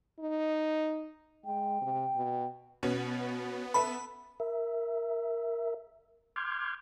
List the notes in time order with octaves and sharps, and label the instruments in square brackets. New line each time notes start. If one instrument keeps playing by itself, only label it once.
[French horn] D#4
[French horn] G#3 [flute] G5
[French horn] C3
B2
[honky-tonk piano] B2 C#4 [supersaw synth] B3
[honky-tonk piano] A4 B4 E5 [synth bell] B5
[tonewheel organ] A#4 E5
C6 D6 F6 G6 G#6